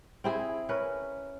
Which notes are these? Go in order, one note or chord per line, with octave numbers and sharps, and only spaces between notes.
C4 E4 G#4
C#4 A#4 B4